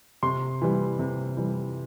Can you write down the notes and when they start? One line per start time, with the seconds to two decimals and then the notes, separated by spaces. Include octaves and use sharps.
0.23 C3 C6
0.62 E3 G3
0.99 C3
1.37 E3 G3